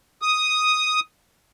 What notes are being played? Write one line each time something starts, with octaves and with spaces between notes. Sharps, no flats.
D#6